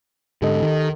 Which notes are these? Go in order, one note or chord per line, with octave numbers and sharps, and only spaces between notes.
G#2 D3 G4 A4 D#5
D#3